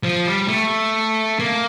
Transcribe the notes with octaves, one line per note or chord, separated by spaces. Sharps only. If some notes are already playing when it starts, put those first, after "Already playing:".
F3
G3
A3
A#3